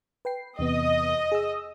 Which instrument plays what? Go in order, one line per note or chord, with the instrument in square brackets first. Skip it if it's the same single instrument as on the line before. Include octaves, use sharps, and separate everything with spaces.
[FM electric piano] B4 G5 C7
[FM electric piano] E2 C3 B3 [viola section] D#5
[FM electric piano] G#4 E6